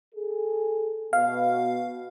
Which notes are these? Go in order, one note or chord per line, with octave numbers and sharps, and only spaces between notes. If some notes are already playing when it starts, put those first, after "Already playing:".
G#4 A4
B2 F5